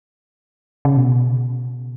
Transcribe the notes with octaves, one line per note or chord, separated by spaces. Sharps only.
C#3
B2